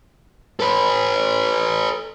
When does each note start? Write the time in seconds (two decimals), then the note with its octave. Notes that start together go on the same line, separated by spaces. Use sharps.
0.60 A4 B4